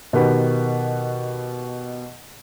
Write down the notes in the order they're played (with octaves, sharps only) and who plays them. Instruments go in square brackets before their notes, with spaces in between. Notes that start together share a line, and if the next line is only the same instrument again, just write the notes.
[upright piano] B2 D#3 G4 B4